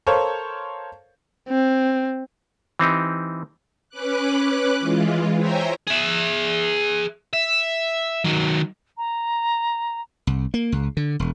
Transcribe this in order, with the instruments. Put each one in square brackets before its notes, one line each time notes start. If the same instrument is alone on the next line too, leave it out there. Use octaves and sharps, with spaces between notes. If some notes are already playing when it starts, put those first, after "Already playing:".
[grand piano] A4 A#4 C5 C#5 F5 C#6
[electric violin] C4
[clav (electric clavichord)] E3 C4 D#4 G4
[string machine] C#4 B4 D6 F#6
E3 G#3 F4
C5 C#5 E5 G5 G#5 A#5
[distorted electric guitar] G#4 E5
E5
D#3 F#3
[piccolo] A#5
[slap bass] C2
A#3
C#2
D3
E1